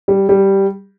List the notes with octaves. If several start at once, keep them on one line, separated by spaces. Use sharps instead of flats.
G3
G3